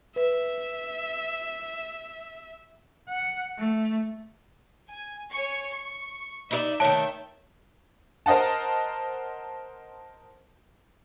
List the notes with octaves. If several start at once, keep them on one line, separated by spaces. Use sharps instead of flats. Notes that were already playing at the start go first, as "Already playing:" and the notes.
B4 E5
F#5
A3
G#5
C#5 G#5 C#6
C#6
D#4 E4 D5 E5
D#3 A3 C#5 E5 G5 A5
A#4 C5 D#5 F#5 A5